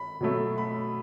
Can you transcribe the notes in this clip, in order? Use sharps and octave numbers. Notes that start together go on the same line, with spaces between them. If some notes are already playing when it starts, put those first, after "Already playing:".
Already playing: B5
B2 F#3 A3
B5